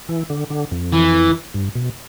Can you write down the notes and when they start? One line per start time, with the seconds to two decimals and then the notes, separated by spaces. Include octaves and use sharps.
0.09 E3
0.30 D3
0.50 D3
0.71 F2
0.92 E3
1.54 G2
1.75 B2